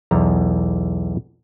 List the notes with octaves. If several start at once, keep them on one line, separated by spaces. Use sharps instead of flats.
B1 E2 A#5